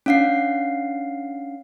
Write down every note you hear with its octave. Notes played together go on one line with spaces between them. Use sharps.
C#4 D4 F5 F#5 C7